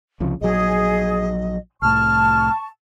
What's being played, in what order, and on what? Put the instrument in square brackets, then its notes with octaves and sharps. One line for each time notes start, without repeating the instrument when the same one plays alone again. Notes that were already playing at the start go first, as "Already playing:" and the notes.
[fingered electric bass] C2 C#3 F3
[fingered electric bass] A#1 F#3 [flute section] G#4 [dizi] D#5
[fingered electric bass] C2 A2 [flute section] A5 C#6 [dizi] F6